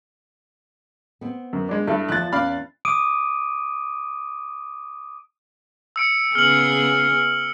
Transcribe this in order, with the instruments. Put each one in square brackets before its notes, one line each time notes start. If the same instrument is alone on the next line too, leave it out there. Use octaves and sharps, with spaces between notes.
[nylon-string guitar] B3 C4
[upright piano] F#2
G#3 D4
[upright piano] G2 E4 [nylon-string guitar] A4
[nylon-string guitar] E2 F3 E5 [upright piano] F#6 A6
[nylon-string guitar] E2 C#4 [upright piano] D5 F5 B5
[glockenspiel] D6 D#6 D7 D#7
[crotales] E6 C#7 D7
[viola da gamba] C#3 B3 G#4 [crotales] F6 F#7